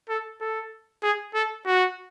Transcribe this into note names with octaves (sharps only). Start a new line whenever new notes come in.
A4
A4
G#4
A4
F#4